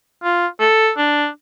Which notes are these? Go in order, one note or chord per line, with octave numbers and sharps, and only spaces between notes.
F4
A4
D4